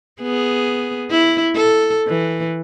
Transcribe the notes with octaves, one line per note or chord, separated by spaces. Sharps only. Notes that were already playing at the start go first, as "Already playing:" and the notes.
B3 G#4
E4
A4
E3